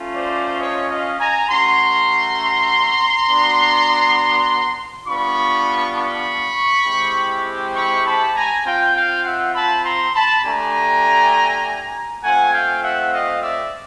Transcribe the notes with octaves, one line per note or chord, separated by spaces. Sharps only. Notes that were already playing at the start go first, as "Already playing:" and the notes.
Already playing: A3 C#4 F4
C5 D5
C#5 D#5
D#5 F5
G#5 A#5
A3 C#4 F#4 A#5 C6
B3 D4 F#4
G3 B3 D4 F4 B5 C#6
B5 C#6
G#3 C4 E4 G4
B5 C#6
A5 B5
G#5 A#5
C4 F4 F5 G5
F5 G5
E5 F#5
A5 B5
A#5 C6
A5 B5
A3 D4 G4 G#5 A#5
A3 C4 F4 F#5 G#5
F5 G5
E5 F#5
D#5 F5
D5 E5